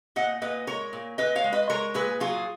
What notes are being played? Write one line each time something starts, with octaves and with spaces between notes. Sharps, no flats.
A#2 D#5 F#5
A#2 B4 D#5
G#3 A#4 C#5
A#2
A#2 B4 D#5
C#5 F5
G#3
B4 D#5
G#3 A#4 C#5
A#2 G#4 B4
F#3 F4 G#4